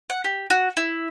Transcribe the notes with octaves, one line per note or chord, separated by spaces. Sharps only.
F#5
G4
F#4
E4